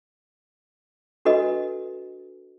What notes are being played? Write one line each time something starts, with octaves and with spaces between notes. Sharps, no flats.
D4 F#4 A4 B4 D#5